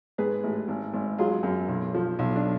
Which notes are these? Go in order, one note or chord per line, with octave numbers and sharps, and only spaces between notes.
G#2 G#4 B4
A1
G#1
G#1
F#3 F4 G#4
F#2
B1
F3
B1
D4